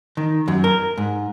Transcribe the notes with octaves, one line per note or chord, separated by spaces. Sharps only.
D#3
F#2
A#4
G#2